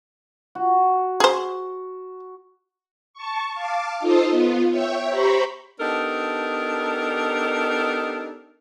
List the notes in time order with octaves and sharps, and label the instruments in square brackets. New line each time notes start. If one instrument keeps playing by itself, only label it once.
[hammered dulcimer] F#4
[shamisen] G#4 C5
[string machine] A5 C#6
F5 A5 D6
D#4 F4 A4 C5 D#5
B3 F4
C#5 E5 G5
G4 C5 A#5 B5 C#6
[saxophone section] B3 D4 D#4 G4 A4 A#4